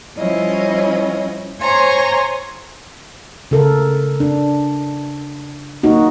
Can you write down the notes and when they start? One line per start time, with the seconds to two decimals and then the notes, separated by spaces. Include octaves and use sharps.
0.17 F3 G3 C#4 E4 C#5 D#5
1.61 C5 C#5 G#5 A#5 C6
3.51 C#3 A4 A#4
4.20 D4
5.83 A#3 D#4 F#4